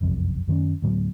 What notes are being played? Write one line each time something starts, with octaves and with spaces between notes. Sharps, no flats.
F#1 B1 F2 C3
F#2 D#3 B3 C#4
D2 A2 F#3 B3